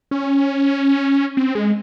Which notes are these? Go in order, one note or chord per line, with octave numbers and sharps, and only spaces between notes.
C#4
C4
G#3